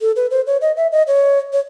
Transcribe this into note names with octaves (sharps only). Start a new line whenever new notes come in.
A4
B4
C5
C#5
D#5
E5
D#5
C#5
C#5